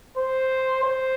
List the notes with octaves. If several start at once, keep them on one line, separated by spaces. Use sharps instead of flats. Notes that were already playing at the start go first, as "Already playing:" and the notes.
C5
C5